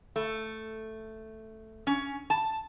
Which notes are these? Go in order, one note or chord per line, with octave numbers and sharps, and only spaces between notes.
A3
C#4
A5